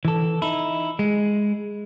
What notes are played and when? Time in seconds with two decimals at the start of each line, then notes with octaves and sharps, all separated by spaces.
0.05 E3 A4
0.42 D#4 E4
0.99 G#3